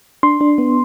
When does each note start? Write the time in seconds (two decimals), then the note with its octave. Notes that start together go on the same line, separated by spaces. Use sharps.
0.23 D4 C6
0.41 D4
0.58 B3